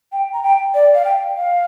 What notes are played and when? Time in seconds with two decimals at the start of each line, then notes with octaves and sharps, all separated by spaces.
0.12 G5
0.33 A#5
0.43 G5
0.74 D5
0.95 F5
1.05 G5
1.36 F5